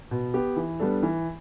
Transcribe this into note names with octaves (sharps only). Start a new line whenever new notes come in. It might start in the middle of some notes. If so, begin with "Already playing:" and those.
B2
B3 G4
E3
G3 B3 D4 A4
E3